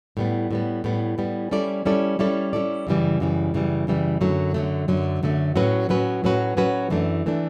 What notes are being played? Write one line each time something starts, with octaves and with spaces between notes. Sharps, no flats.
A2 G3 B3
A2 G3 B3
A2 G3 B3
A2 G3 B3
G3 C#4 E4 A4 D5
G3 C#4 E4 A4 D5
G3 C#4 E4 A4 D5
G3 C#4 E4 A4 D5
F#2 C#3 E3 G3
F#2 C#3 E3 G3
F#2 C#3 E3 G3
F#2 C#3 E3 G3
F#2 D3 F#3 A3
F#2 D3 F#3 A3
F#2 D3 F#3 A3
F#2 D3 F#3 A3
A2 F#3 C#4 F#4 B4
A2 F#3 C#4 F#4 B4
A2 F#3 C#4 F#4 B4
A2 F#3 C#4 F#4 B4
F#2 E3 A3 D4
E3 A3 D4